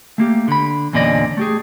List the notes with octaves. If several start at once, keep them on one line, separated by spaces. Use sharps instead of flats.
A3 A#3 G4
D3 B5
E2 A#2 D3 C#4 D5 D#5
A3 G4 G#4